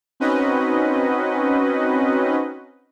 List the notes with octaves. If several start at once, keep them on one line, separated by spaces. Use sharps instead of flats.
C4 C#4 D#4 F#4 B4 D#5